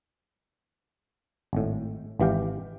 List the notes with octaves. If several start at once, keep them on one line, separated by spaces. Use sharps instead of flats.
G#1 A2
G#1 E3 G4 F5 G5